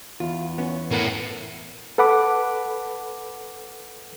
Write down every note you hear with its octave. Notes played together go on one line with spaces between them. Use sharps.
E2 F4
B3 C#4
A2 B3 A#4 F#5
A4 B4 F#5 B5 D6